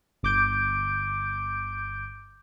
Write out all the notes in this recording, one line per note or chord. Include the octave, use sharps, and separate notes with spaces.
G1 D6 G6 D7